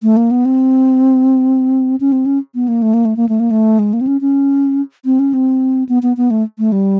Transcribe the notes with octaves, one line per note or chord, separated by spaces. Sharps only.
A3
A#3
B3
C4
C#4
C4
C#4
B3
A#3
A3
A#3
A3
A#3
A3
A#3
A3
G#3
A#3
C4
C#4
C#4
C4
C#4
C4
B3
B3
B3
A3
A3
G3